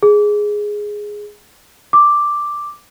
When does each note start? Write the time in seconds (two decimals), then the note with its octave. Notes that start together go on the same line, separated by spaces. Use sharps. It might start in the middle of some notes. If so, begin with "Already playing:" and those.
0.03 G#4
1.93 D6